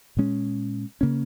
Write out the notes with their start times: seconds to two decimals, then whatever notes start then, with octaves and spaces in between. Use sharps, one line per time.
0.17 A#2 G#3 C#4
1.01 C#3 A#3 C#4